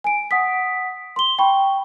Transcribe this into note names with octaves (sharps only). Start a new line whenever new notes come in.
G#5 D7
F#5 D#6 B6
C6 G7
G5 B5 C#6